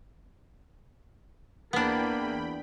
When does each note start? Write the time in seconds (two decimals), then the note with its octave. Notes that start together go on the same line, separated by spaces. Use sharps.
1.73 E2 A#3 B3 D4 G5 B5